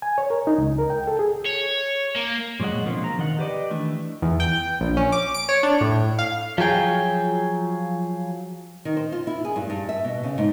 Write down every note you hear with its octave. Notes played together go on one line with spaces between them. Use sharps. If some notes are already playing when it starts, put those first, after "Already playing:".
G#5
C#5
A#4
D#4
C#2
A#4
G5
A4
G#4
C#5
A#3
A#2 F#3 G#3 D#5 F#5
B2 D3 F3 A#3 C4
A#5
D#3 D#5 F#5
G4 B4 D5 D#5
D#3 E3 A3 D4 E4
E2
G5
A#1
C#4
D6
D7
C#5
D4
A2
F5
F3 F#3 G#4 G5
D#3
C5
F4
E4
G#4
G2
G2
E5
B2
C#3
G#2